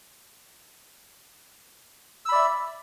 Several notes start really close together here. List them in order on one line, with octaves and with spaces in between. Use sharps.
E6 B5 D5 E5